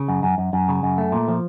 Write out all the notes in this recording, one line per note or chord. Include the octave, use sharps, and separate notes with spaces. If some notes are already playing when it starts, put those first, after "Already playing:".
Already playing: C#3
F#2
F#2
F#2
F#2
C#3
F#2
A3
A#2
F3